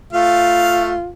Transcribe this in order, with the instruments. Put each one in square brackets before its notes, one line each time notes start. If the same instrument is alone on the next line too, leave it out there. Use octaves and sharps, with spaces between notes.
[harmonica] A3 F5 [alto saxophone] F4